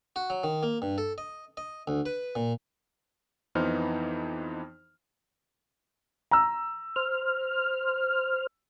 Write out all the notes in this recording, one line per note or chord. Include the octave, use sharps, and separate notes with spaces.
F#4
F#3
D#3
A#3
G2
A4
D#5
D#5
D2
B4
A#2
F2 E3 B3 D#4 C5 F6
A#5 E6
C5 F6